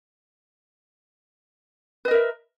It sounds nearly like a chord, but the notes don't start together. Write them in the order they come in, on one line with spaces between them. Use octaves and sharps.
B4 D#5 A#4 E5